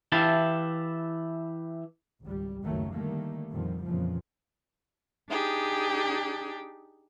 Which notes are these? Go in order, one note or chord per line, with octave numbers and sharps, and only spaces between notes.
E3 E4 G4 F5 A5
G#1 C#2 G3
F#1 C#2 D#3 F#3 A3
D3 D#3 G3 A3 A#3
F2 A#2 D3 D#3 F3 G3
F2 A#2 C#3 E3 F3
D4 D#4 G4 G#4